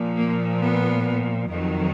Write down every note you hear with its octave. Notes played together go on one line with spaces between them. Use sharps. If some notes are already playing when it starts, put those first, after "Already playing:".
Already playing: A#2 F3
A#3
B3
F2 D#3 F#3